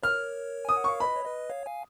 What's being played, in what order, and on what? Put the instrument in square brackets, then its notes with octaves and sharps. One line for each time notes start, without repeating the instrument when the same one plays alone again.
[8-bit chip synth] A#4 C#5 [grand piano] F6
[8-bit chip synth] G#5 [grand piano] D#6
[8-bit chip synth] F#5
[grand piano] C#6
[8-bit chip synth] F5
[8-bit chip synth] B4 D#5 [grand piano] B5
[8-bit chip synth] C#5
B4 D#5
C#5 F5
F5 G#5